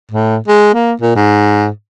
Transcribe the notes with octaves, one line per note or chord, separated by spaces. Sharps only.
A2
G#3
A#3
A#2
G#2